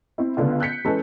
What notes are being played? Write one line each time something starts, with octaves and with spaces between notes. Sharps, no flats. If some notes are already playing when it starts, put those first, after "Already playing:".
C4 E4
C#2 D3 B3 F4
F#6 G6 B6 C#7
E3 G#3 C#4 A4 B4